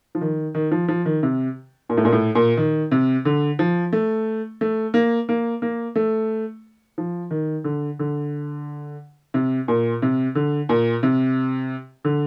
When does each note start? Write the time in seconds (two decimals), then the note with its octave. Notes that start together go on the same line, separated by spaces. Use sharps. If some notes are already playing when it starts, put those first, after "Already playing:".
0.15 F3
0.21 D#3
0.55 D#3
0.71 F3
0.88 F3
1.05 D#3
1.23 C3
1.89 A#2
1.97 A2
2.05 A#2
2.13 A2
2.35 A#2
2.57 D#3
2.91 C3
3.25 D3
3.59 F3
3.93 A3
4.61 A3
4.94 A#3
5.29 A#3
5.62 A#3
5.96 A3
6.98 F3
7.31 D#3
7.64 D3
7.99 D3
9.34 C3
9.68 A#2
10.02 C3
10.35 D3
10.69 A#2
11.03 C3
12.05 D3